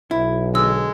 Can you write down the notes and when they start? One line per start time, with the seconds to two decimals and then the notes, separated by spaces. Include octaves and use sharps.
0.11 B1 E4
0.55 D3 G#3 E6